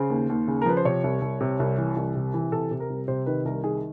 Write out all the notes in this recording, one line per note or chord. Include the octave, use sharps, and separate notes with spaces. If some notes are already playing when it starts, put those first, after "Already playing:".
Already playing: C#3 C5
D#2
D#2
C#3
A#4
F3 B4
C5
C3 C#5
C2
C2
C3
C2
E3
C2
C3
E3
C3 A4
C3
A#4
C2
C3 C5
D#3 B4
C2 A#4
D#3 G#4